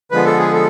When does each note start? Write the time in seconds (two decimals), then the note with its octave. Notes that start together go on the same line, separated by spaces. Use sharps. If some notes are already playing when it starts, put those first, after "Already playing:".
0.11 D3 F3 G#3 B3 B4
0.25 A4
0.39 G#4
0.53 A4